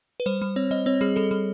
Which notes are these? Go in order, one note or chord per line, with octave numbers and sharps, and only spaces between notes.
B4
G3 C5
G3
C4 C#5
G3 D#5
C4 C#5
G3 G#4
G3 A4
G3